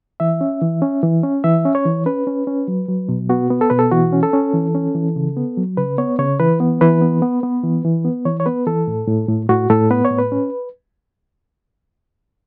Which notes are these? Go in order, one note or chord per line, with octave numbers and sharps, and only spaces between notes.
E3 E5
C#4
E3
C#4
E3
C#4
E3 E5
C#4
C#5
E3
C#4 B4
C#4
C#4
F#3
F#3
B2
B3 F#4
B3
A4
B2 B4
A4
E3 F#4
C#4
A4
C#4
E3
C#4
E3
C#3
B3
F#3
C#3 B4
B3 C#5
C#3 C#5
E3 B4
B3
E3 B4
B3
B3
B3
E3
E3
B3
E3 C#5
C#5
B3 B4
E3 A4
A2
A2
A2
A2 F#4
A2 A4
B3 B4
C#5
A2
B4
C#4